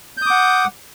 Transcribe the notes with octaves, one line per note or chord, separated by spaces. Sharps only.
F#5 D6 D#6 G6